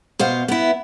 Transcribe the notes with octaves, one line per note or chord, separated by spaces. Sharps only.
B2 C5 F5
B3 E4